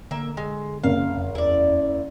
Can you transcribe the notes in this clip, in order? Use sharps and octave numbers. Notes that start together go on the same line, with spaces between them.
D3 A#3 E5
G#3
F#1 F5
F2
E2 E4 D5